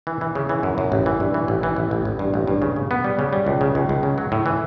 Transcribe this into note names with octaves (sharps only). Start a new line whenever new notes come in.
E3
E3
C#3
E3
F#2
F#2
A1
E3
G2
E3
A1
E3
A1
A1
A1
G2
A1
G2
C#3
C#3
B3
G3
C#3
G3
C#2
C#3
C#2
C#2
C#3
F#3
A2
E3